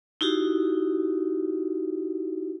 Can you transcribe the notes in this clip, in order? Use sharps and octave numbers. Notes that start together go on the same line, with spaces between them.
D#4 E4 F#4 G4